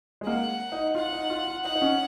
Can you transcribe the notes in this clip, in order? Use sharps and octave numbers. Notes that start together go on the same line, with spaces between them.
G#3
A#3 F#5
D#4
F4 F#5
D#4
F4
F4
D#4 F#5
D#4
C#4